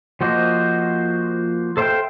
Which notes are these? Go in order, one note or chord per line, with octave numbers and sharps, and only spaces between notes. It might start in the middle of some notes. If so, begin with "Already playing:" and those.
F3 A#3 F#4 C5 D#5
A4 C5 E5 F5 G5